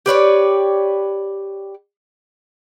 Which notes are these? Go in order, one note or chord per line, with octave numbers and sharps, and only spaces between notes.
G4 B4 C#5 D5